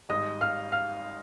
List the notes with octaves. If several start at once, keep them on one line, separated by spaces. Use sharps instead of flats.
G#1 G#2 G3 D#5 D#6
F5 F6
F5 F6